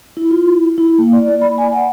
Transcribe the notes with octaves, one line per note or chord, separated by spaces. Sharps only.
E4
F4
E4
E4
A#3
D5
D5
B5
G#5
F#5